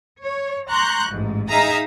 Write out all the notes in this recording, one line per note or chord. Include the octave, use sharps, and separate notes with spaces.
C#5
A#5 C6 C#6 F#6 G6
A1 G#2
D#4 G#4 E5 F5 A#5 D#6